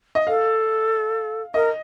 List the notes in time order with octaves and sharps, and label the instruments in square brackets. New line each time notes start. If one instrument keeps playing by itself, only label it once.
[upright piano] D#5
[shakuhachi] A4 [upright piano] F5
[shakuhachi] A#4 [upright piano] D#5